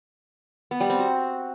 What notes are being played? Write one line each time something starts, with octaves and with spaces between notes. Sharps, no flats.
B3
G3
C4
F#4